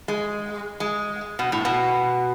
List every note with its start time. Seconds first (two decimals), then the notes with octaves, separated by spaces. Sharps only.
0.08 G#3
0.80 G#3
1.39 B2
1.52 A2
1.65 B2